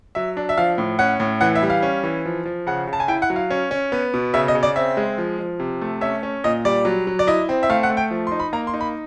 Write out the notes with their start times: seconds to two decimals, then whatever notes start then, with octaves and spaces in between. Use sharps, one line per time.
0.15 F#3 E5
0.37 D4
0.49 E5
0.58 F3 F5
0.78 A2
0.99 C#4 F#5
1.20 A2
1.41 E3 F#5
1.55 E5
1.63 G3
1.70 F5
1.83 C#4
2.03 E3
2.26 F3
2.45 F3
2.67 C#3 F#5
2.87 C#3
2.93 A5
3.00 G#5
3.08 E4 G5
3.22 F#5
3.30 F#3
3.36 F5
3.50 C#4
3.71 C#4
3.92 B3
4.14 B2
4.34 C#3 E5
4.48 D#5
4.55 C#3
4.63 D5
4.76 C4 E5
4.97 G#3
5.18 F3
5.39 F3
5.60 C3
5.81 A3
6.01 C#4 E5
6.23 C#4
6.44 A#2 D#5
6.65 G3 D5
6.85 F#3
7.07 F#3
7.19 D5
7.27 E4 D#5
7.49 C4
7.63 E5
7.70 A3 F5
7.83 F#5
7.90 A3
7.97 G5
8.11 F3
8.27 D#4 C6
8.40 B5
8.53 A#3 A#5
8.67 C6
8.74 D#4
8.81 B5